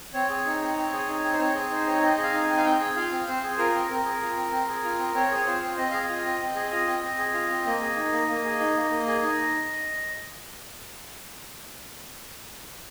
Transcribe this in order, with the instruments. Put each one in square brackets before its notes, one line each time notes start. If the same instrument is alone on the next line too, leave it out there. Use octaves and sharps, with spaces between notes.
[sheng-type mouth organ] C4 C#5
G#4
D#4
C4
C4
G#4
D#4
C4
C5
C4 C#5
G#4
D#4 C5
C4 C#5
C4 D#5
G#4
F5
D#4
C4 G#5
F5
C4 G5
G#4
F4 F5
C4
C4 C5
G#4
F4 A#4
C4
C4 A#4
G#4
F4
C4
C4
G#4
F4
C4
C4 C#5
G#4
C#5
F4 C5
C4
C4 D#5
G#4 F5
D#5
F4
C4
C4
G#4
F4
C4
C4
G#4
F4
C4
A#3 D#5
G#4
D#4
A#3
A#3
G#4
D#4
A#3
A#3
G#4
D#4